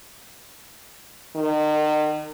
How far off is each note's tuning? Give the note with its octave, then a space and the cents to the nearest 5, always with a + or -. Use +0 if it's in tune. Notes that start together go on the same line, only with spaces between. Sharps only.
D#3 -35